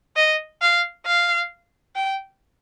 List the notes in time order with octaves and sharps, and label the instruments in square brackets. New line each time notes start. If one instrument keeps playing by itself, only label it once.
[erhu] D#5
F5
F5
G5